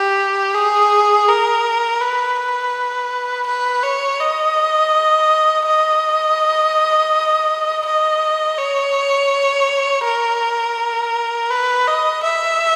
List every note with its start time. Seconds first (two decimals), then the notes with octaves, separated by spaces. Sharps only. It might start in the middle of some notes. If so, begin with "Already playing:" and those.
Already playing: G4
0.54 G#4
1.28 A#4
2.00 B4
3.46 B4
3.83 C#5
4.20 D#5
5.66 D#5
7.85 D#5
8.58 C#5
10.04 A#4
11.50 B4
11.87 D#5
12.23 E5